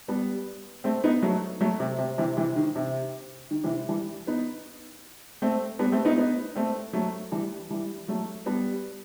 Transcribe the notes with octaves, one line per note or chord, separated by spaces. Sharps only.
G3 B3
A3 C4
B3 D#4
F#3 A3
F#3 A3
C3
C3
C3 E3
C3 E3
D#3
C3
D#3
C3 E3
E3 G3
B3 D#4
A3 C4
G3 B3
A3 C4
B3 D#4
B3 D#4
A3 C4
F#3 A3
E3 G3
E3 G3
F#3 A3
G3 B3